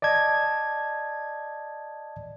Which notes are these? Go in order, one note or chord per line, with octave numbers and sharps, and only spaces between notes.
D5 D#5 A5 G#6